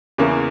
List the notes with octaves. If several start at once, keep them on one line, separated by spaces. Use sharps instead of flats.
E2 C#3 E3 A#3 C#4